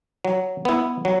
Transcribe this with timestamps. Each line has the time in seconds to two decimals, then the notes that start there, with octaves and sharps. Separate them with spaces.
0.25 F#3
0.65 B3 E4
1.05 F#3